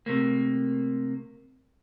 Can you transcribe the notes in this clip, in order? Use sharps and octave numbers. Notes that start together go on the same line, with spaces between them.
C3 A3 A#3